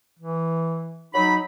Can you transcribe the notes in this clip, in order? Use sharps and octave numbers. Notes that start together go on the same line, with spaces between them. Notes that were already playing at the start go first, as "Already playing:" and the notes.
E3
F#3 D#4 B5